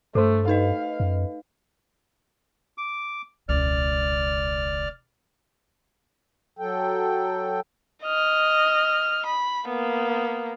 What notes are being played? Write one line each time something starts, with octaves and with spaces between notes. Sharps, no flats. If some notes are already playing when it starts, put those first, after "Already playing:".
G2 A3 A4 C5 C6
D#4 B4 D#5 F5
F#2
D6
E1 C#2 D5 F6
F#3 A4 G5
D#5 F6
B5
A#3 B3